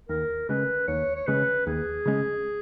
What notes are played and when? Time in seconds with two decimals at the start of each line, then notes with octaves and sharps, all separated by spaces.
0.09 D#2 A#4
0.49 C#3 G#3 C#4 B4
0.88 D#2 C#5
1.15 C#5
1.27 C#3 G#3 C#4 B4
1.66 D#2 G#4
2.06 C#3 G#3 C#4